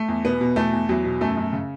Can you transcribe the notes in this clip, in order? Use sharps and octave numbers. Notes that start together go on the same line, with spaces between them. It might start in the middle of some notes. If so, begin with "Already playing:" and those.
Already playing: A3
E2
B2 B3
B2
E2 A3
E2
E2 F#3
B2
F#2 A3
F#2
C#3